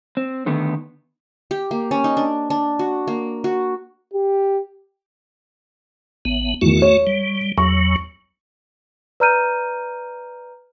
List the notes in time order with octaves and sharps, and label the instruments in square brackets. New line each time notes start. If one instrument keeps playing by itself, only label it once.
[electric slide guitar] C4
D3 D#3 A3 B3
[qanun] G4
A#3
C#4
D#4
D4
D4
F#4
A#3
F#4
[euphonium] G4
[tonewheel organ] A1 B3
[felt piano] E2 D#3 [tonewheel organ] A3 F#4
[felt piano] C#5
[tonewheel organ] G3
[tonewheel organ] E2 F#3 [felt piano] C#6
[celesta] B4 D5 A#5 F6 G6 D#7